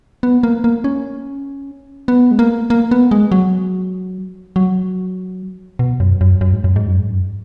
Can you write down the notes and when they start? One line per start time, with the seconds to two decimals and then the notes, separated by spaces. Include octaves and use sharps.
0.23 B3
0.43 A#3
0.64 A#3
0.84 C#4
2.08 B3
2.31 G#3
2.39 A#3
2.70 A#3
2.91 B3
3.11 G#3
3.32 F#3
4.56 F#3
5.79 B2
6.00 F#2
6.21 F#2
6.41 F#2
6.53 G#2
6.64 F#2
6.76 G#2
6.88 F#2
6.99 G#2
7.10 F#2